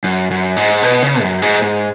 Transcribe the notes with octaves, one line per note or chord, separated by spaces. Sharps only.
F#2
F#2
G#2
B2
C#3
F#2
G#2
G#2